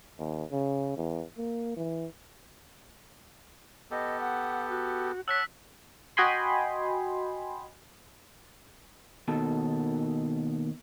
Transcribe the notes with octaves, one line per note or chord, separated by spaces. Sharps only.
D#2
C#3
E2
A#3
E3
B3 G4 A4 D#5
F#5
F#4
C#5 F#5 A5 E6 F#6 B6
F#4 D#5 G5 G#5 B5 C6
D#2 B2 D#3 A4